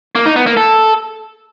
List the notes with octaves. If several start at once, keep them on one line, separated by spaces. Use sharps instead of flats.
A#3
D#4
B3
A#3
A4